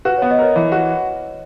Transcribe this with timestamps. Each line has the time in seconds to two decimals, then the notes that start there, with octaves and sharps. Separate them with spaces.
0.05 F#4 B4
0.18 B3 C#5
0.31 D#5
0.39 A#4 C#5
0.56 E3
0.72 F#4